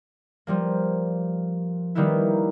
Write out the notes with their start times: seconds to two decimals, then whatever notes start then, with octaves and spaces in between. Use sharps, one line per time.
0.47 F3 G3 A#3
1.95 D#3 G3 A#3 B3 E4